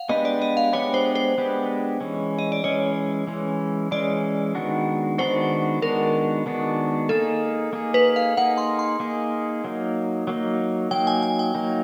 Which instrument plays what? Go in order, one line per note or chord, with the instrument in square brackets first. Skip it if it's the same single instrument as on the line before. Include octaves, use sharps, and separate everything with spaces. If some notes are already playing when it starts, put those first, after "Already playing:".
Already playing: [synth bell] F5 F#5
[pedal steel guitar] G#3 B3 D4 G4 B4 [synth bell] D#5
[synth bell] D5
D#5
F5
[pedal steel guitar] G#3 B3 D4 G4 B4 [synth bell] C#5
[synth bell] C5
C5
[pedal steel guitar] G#3 B3 D4 G4 B4
E3 G#3 C#4
[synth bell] D#5
D5
[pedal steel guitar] E3 G#3 C#4 [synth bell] C#5
[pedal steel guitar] E3 G#3 C#4
[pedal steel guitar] E3 G#3 C#4 [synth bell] D5
[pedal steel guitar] D#3 G#3 B3 D4 F#4
[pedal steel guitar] D#3 G#3 B3 D4 F#4 [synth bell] C5
[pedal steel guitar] D#3 G#3 B3 D4 F#4 [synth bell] A#4
[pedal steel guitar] D#3 G#3 B3 D4 F#4
[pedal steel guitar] A#3 D#4 G#4 [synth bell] A4
[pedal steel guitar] A#3 D#4 G#4
[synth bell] B4
F5
[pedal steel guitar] A#3 D#4 G#4 [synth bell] F#5
[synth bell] C6
C6
[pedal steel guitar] A#3 D#4 G#4
F#3 A#3 D#4
F#3 A#3 D#4
[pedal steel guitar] F#3 A#3 D#4 [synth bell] G5
[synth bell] G#5
G#5
G5
[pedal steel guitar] F#3 A#3 D#4